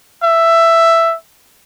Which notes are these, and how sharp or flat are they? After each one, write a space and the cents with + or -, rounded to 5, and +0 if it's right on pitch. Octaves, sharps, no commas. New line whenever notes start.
E5 +10